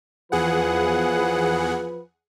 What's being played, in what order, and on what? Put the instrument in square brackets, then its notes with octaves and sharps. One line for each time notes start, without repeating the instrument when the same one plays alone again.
[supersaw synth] E2 G#4 F#5 [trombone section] F3 B4